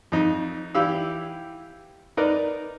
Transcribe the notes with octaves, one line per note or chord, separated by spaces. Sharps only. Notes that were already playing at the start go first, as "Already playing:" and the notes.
F2 D#4
E3 E4 G4 F5 E6
D#4 A#4 B4 D5